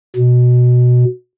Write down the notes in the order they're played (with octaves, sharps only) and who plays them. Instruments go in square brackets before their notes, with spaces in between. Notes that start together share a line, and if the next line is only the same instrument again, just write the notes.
[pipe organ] B2